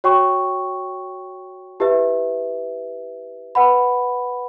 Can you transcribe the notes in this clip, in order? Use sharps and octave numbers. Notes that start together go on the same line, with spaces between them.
F#4 C#5 G5 C#6
E4 G4 B4 E5
B4 F#5 B5